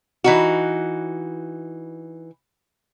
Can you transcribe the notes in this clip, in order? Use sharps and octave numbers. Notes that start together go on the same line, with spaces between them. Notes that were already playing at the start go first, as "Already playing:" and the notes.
E3 D#4 F#4